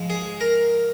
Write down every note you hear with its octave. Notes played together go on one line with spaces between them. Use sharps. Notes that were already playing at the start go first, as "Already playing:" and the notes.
Already playing: G#2 F3 G#3
G#4
A#4